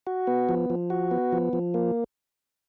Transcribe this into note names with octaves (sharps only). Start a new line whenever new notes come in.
F#4
B3
F3
F3
F#4
B3
F3
F3
A#3